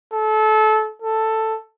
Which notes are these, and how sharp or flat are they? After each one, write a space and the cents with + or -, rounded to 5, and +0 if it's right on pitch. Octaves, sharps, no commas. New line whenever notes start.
A4 -25
A4 +5